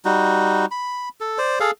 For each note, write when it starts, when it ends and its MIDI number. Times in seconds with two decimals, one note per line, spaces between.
0.05 0.66 55
0.05 0.66 63
0.05 0.66 66
0.71 1.09 83
1.20 1.38 69
1.38 1.59 72
1.38 1.59 74
1.60 1.71 68
1.60 1.71 69
1.60 1.71 77